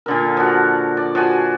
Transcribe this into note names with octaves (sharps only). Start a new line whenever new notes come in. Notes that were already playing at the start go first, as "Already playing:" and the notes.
A#2 D3 A#4
F3 F#4
D5
F3 F#4 G#5